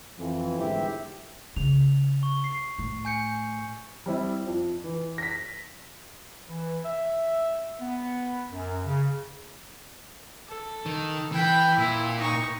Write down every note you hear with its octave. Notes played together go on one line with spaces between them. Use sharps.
F2 E3
G1 G#2 E3 G4 C5 E5
C#3 F7
C#6
C7
A2
G#5 G6 C#7
G3 C4 E4
F2
E3
A#6 B6
E3
E5
B3
F#2
C#3
A4
D#3
E3 G5 B5
A#2 E4
D#4 C#6